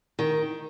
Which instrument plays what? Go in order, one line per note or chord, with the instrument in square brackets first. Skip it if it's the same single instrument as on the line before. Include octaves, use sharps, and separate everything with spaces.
[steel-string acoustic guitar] D#3